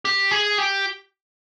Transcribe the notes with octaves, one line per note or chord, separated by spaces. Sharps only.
G4
G#4
G4